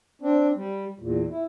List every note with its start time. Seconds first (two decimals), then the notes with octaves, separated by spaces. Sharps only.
0.22 C4 D4
0.56 G3
1.00 E2 A#2
1.31 E4